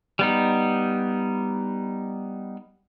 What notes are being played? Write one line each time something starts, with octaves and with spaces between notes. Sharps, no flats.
G3 B3 D#4